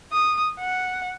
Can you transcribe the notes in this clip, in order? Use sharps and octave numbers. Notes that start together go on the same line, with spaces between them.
D#6
F#5